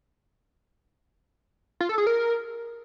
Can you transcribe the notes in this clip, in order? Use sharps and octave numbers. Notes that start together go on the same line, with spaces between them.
F4
A4
G#4
A#4